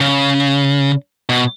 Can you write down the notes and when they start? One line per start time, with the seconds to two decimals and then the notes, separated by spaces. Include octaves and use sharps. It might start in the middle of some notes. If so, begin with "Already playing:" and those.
0.01 C#3
1.29 B2